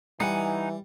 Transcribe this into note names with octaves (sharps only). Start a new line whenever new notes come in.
E3 G3 D#4 F#5 G#5